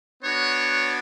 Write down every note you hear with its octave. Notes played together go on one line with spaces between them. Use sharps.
B3 D4 F#4 C#5